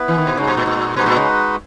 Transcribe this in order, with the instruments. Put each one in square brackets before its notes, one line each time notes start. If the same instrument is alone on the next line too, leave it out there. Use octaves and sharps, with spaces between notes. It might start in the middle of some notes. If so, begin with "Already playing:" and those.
Already playing: [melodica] B3 E4 B4
[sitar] E3
D#3
B2
[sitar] C#3 [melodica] G#3 D#4 F#4
[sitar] B2
A#2
A#2
[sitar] B2 [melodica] G#3 D#4 F#4 B4
[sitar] A#2
C#3